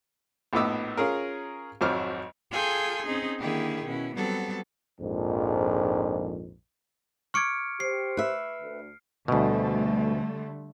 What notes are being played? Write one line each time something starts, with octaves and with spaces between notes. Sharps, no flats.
A#1 A2 B3 D#4 D6 E6
C#4 F4 G#4 A#4
G#1 F2 F#3 C5 D6 F6
F4 G#4 A4 G5 G#5 C6
C4 C#4 D#4 G#4
D3 D#3 A#3 E4 G4 G#4
B2 C#4 E4
F#3 G3 B3 C4 A4
A#1 F2 G#2
C#6 D6 F6 G#6 C#7 D7
G4 C5 C7
B4 E5
D2
D2 B2 D3 G3 A3